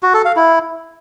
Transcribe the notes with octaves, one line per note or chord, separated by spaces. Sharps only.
F#4
A4
F5
E4